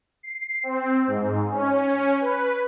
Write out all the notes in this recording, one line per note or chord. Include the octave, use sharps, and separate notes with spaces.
C7
C4
G#2
C#4
B4